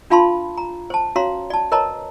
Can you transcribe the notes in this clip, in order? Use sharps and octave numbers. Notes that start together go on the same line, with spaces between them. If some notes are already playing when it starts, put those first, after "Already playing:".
D4 F4 F5 A5 B5 C6
A#5
C5 A5
C#4 F#4 C#5 F5 A#5 C6
D5 A5
A#4 B4 C#5 D#5 A5 A#5